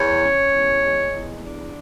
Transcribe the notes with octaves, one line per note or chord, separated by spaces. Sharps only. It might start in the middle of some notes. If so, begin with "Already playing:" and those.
Already playing: E2 C#5
C#4
E2
G#3
E2
D4